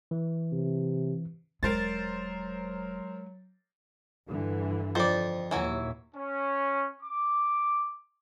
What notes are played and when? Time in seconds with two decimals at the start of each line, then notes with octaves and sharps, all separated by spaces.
0.11 E3
0.52 C3
1.63 E1 F#3 G#3 A#4 C5 A6
4.28 G2 D3 E3
4.95 F2 C5 D5
5.51 D#2 A#2 E3 F#3 E4
6.15 C#4
7.02 D6